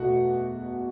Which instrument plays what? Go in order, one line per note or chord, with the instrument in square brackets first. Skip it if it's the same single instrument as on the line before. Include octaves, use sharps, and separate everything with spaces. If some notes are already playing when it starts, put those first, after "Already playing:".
Already playing: [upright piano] E2 B2 A3 F#4 F#5